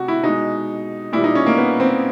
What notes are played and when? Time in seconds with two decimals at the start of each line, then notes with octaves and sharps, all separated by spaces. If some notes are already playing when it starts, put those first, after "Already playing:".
Already playing: C3 F#4
0.08 E4
0.23 B2 G#3 D#4
1.13 A#2 G3 E4
1.24 D#4
1.35 C#4
1.47 A#3
1.58 B3
1.80 C4